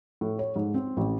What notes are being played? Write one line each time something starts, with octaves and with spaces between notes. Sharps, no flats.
A2
C#5
G#2
C4
A1